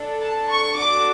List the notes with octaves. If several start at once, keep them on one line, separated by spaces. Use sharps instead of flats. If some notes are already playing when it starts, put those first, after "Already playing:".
Already playing: D4 A4
A5
C#6
D4 F#4 A4 D6